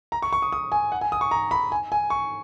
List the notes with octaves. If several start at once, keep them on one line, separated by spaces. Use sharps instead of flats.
A#5
C#6
C#6
D#6
D#6
G#5
F#5
G#5
D#6
C#6
A#5
B5
G#5
G#5
C#6